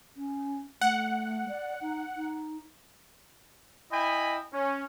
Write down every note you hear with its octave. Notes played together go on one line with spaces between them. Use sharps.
C#4
A3 F#5
D5
D#4
D#4
E4 D#5 G5 G#5 B5
C#4